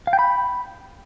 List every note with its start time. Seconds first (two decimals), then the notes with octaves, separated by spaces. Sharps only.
0.07 F5
0.13 G5
0.19 B5